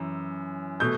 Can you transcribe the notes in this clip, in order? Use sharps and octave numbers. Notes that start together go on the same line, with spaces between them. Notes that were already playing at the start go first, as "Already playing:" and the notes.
Already playing: F#2 E3
B2 A3 G6